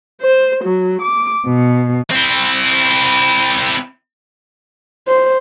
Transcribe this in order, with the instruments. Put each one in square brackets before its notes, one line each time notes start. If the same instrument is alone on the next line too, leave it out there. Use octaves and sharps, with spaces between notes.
[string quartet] C5
F#3
D6
B2
[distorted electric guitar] C4 E4
[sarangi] C5